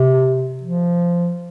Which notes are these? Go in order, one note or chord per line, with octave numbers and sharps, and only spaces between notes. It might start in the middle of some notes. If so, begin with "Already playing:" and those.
Already playing: C3
F3